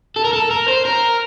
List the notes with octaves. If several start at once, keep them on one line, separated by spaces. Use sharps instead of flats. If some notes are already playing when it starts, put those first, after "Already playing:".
A4
A#4
A4
A#4
C5
A#4